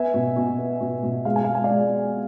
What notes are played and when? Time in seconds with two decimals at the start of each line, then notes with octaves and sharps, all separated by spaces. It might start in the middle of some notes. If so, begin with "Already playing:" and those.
Already playing: B3 E5 G#5
0.14 B2
0.36 B2
0.59 B3
0.81 B2
1.03 B2
1.25 G#3 F5
1.36 G#5
1.44 G#3 F5
1.55 G#5
1.64 D5 F5
1.70 G#3